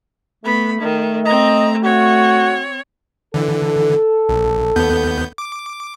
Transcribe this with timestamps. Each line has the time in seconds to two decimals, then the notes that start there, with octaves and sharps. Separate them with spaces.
0.44 A3 B3 B5
0.80 D#3 A3
1.25 C4 D#5 A#5
1.84 C4 F#4 C#5
3.34 D3 E3 A4
4.29 A#1
4.76 D#2 B3 G6
5.38 D6